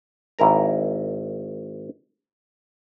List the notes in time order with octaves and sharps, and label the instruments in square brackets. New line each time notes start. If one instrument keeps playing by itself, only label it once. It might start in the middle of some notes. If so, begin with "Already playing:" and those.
[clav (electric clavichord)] G#1 E4 A#4 A#5